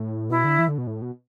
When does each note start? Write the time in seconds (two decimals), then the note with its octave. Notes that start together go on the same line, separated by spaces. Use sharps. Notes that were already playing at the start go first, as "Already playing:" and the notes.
Already playing: A2
0.30 B2 E4
0.44 D3
0.59 E3
0.68 D3
0.78 B2
0.87 A2
1.02 B2